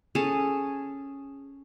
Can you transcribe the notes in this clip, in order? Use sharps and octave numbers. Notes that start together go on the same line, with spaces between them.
C#4 G#4 A4 A5